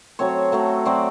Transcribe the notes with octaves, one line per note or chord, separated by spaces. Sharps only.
F#3 A3 C4 C#5
F#3 A3 C4
F#3 A3 C4 D5